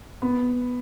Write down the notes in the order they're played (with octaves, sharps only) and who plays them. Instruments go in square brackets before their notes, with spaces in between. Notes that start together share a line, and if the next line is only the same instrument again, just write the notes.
[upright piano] B3